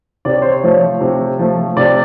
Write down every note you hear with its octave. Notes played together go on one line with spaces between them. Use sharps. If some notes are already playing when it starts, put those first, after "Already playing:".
C3 D5
C#5
C5
C#5
F3 A3
C3
F3 A3
C3 D5